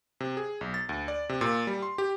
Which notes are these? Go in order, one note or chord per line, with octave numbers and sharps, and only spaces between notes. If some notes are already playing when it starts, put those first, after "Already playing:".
C3
G#4
B1
A6
D2
D5
C3
A#2
G3
C6
G4